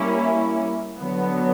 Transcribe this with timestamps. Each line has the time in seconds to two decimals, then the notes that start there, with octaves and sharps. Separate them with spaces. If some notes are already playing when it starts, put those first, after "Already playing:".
Already playing: G3 A#3 C#4 E4
0.99 D3 F#3 B3